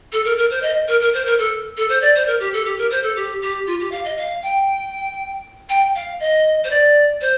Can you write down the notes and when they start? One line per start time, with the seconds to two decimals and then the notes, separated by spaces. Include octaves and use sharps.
0.12 A4
0.24 A#4
0.37 A#4
0.50 C5
0.62 D#5
0.88 A#4
1.00 A#4
1.13 C5
1.26 A#4
1.38 A4
1.77 A4
1.89 C5
2.01 D5
2.15 C5
2.27 A#4
2.40 G4
2.53 A4
2.65 G4
2.77 A#4
2.90 C5
3.03 A4
3.16 G4
3.42 G4
3.66 F4
3.80 G4
3.91 F5
4.04 D#5
4.17 F5
4.42 G5
5.69 G5
5.95 F5
6.20 D#5
6.63 C5
6.70 D5
7.21 C5